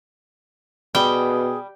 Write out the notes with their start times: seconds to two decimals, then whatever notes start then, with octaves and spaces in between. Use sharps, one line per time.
0.95 B2 G3 G#4 G5